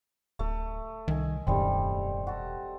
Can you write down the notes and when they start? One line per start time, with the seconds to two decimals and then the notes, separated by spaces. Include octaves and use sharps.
0.39 D1 A3
1.08 C2 D#3 D#5 G#5
1.47 E1 F#2 A2 D#3 G3 A3 C4
2.27 F#4 A4